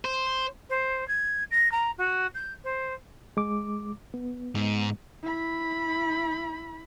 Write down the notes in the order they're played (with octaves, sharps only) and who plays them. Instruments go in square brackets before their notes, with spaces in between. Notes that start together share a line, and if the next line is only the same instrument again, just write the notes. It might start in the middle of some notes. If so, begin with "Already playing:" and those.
[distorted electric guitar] C5
[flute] C5
G#6
A#6
A#5
F#4
G6
C5
[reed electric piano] G#3 D6
B3
[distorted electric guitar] G#2
[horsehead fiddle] E4 B5